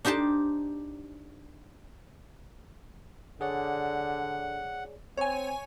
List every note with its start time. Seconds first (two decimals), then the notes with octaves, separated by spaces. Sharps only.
0.05 D4 D#4 G4 C5 A5
3.41 D3 G#4 C#5 D5 F#5
5.17 C4 C#5 G#5